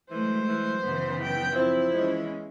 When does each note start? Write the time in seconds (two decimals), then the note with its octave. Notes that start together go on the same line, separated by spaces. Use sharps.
0.11 E3 F#3 G#3 A3 C5
0.49 E3
0.83 F#2 C#3 E3 B3
1.22 G5
1.55 F3 C4 E4
1.94 E3 G#3 B3 C#4